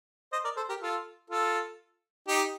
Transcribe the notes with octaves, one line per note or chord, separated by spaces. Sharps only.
C5 D#5
A#4 D5
A4 C5
G4 A#4
F4 A4
F4 A4
D#4 G4